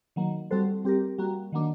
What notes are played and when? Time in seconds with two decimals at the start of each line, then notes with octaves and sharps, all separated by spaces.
0.16 D#3 F#3 A#3
0.51 G3 C4 F#4 A4 C5
0.84 G3 C4 G4 A#4
1.18 G3 A#3 F#4
1.52 D#3 F#3 A#3 D4